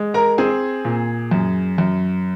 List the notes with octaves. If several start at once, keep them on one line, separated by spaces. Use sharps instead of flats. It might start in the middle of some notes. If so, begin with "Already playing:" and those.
Already playing: G#3
A#4 A#5
C4 G#4 G#5
A#2
F#2
F#2